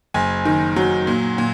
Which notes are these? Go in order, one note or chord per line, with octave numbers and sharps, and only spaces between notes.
F#1 G#5
D#3
F#3
A#2
A#2